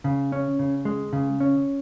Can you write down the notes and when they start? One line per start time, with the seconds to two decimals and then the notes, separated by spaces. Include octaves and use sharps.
0.04 C#3
0.32 C#4
0.59 C#3
0.85 G#3
1.13 C#3
1.40 C#4